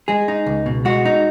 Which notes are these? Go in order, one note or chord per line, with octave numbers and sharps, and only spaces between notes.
G#3 G#4
D#4
C#2
B2
G#3 F#4
D#4